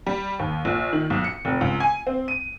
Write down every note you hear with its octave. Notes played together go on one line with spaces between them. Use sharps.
G3
D#2
A#1
D#3
B1
C#7
F1
C#2
G#5
C4
D#7